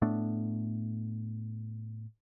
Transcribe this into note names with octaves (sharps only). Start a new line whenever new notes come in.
A2 A3 B3 D4